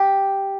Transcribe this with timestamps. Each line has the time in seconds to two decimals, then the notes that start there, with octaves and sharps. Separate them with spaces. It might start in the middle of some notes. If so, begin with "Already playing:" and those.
Already playing: G4